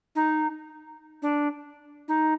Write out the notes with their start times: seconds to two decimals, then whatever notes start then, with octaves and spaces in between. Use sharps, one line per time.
0.15 D#4
1.22 D4
2.08 D#4